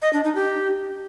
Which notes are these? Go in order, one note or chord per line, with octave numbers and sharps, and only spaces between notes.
D#5
D4
D#4
G4